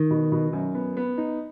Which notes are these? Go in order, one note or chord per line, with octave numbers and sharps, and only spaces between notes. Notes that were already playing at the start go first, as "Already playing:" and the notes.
Already playing: D#3
B2
B2
F#2
B3
B3
D#4